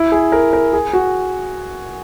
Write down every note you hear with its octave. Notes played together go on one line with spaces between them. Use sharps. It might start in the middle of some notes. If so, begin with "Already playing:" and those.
Already playing: E4
G#4
A#4
A#4
G#4
F#4